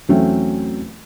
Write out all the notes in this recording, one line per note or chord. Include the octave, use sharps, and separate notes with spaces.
E2 F#3 A3 C4 C#4